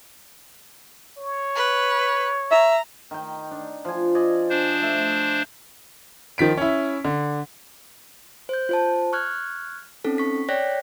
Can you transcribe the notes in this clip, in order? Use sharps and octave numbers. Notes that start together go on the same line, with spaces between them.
C#5
B4
E5 A#5
D#3 G5
D4
F3 G#5
D5 D#5 G#5
D4 C5
A3
D#3 F3 B6 D7
C#4 E4
D3
C5 G6
F4 C5 A5
C#6 F6 F#6 G#6
C4 C#4 D#4 A4
C#6 B6
C#5 D5 G5 F#6 A#6 B6